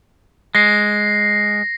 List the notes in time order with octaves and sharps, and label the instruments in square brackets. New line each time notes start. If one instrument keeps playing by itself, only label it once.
[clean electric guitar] G#3 [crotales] A#6 C7